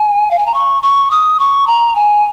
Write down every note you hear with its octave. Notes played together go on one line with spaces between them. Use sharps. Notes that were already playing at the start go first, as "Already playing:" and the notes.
Already playing: G#5
F5
G#5
A#5
C#6
C#6
D#6
C#6
A#5
G#5